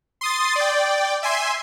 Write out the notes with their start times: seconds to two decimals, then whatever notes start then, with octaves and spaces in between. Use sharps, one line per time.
0.21 C6 D#6 A6
0.56 D5 G5
1.23 E5 G#5 C6